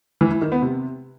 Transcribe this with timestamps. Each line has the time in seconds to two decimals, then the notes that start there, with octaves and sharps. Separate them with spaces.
0.21 E3
0.31 E3
0.41 D#3
0.52 B3
0.62 C3